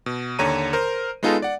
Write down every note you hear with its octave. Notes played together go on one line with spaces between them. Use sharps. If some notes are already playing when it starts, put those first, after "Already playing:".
B2
D#2 D3 C#5 A#5 D#7
A#4 C5
G#3 B3 D#4 F4 G#4 A4
D5 F#5